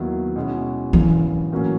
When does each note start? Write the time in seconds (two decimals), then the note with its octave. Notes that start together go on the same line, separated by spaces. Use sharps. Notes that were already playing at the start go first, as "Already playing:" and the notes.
Already playing: D#2 D#3 F#3 B3 E4
0.36 B2 G#3 C#4 E4
0.93 G#1 F#2 C#3 E3
1.52 A2 F#3 A#3 C#4